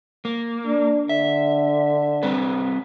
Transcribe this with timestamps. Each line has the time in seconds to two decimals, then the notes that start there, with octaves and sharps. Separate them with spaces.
0.25 A#3
0.67 D4
1.09 D3 E5
2.23 G3 C4 B4